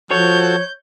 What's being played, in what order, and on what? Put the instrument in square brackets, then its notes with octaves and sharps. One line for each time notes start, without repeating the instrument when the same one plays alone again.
[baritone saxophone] F3 [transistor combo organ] F#4 A4 [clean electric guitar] C#5 [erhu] G6